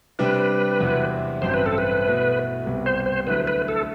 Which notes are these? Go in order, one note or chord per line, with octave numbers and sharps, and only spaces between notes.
C3 G3 D4 B4
E2 C3 F#3 C4 E4
A1 G2 F#3 C4 E4 C5
B4
A4
B4
B2 A3 E4
C2 C3 G3 B3
C5
C5
D2 D3 F#3 A3 E4 B4
B4
A4